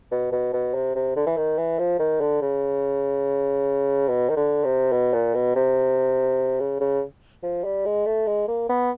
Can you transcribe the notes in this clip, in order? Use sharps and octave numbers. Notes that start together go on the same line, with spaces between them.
B2
B2
B2
C3
C3
D3
E3
D#3
E3
F3
D#3
D3
C#3
B2
D#3
D3
C3
B2
A#2
B2
C3
C#3
C#3
F3
G3
G#3
A3
G#3
A#3
B3